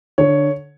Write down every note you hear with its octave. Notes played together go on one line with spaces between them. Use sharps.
D3 C#5